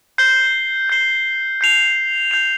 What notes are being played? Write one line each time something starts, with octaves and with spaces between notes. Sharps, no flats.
G6 C7 G7
G6 C7 G7
G6 C7 F7
G6 C7 F7